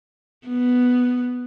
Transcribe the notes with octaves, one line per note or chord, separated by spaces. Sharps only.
B3